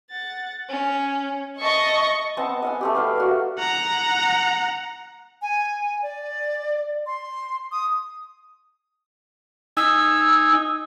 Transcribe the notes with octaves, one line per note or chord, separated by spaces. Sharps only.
F#5 A6
C#4
D#5 E5 A5 C#6
B3 C4 D#5 A5
D#5 F#5 G#5
A3 C4 G4
B4 F5 G5
F#4 A#4 D5
F#5 A#5
G#5
D5
C6
D#6
D#4 G#5 E6